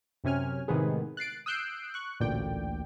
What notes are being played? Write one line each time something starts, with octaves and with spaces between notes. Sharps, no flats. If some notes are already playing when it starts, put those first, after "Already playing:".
F#2 C3 C#4 G#5 F6
A2 C3 D#3 G#3 B3 G#4
F#6 A6 C7 D7
D#6 E6 F#6 G6 C7 D7
C#6 F#6
A1 D2 A#2 D5 G5